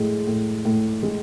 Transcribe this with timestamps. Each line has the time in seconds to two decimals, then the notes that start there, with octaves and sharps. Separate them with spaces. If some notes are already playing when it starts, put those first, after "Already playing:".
Already playing: A2 G#3
0.27 A2
0.65 A2
1.03 G#3